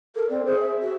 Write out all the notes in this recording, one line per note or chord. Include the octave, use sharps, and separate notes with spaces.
A4 A#4
C4 D5
G#4 C5
E5
F#4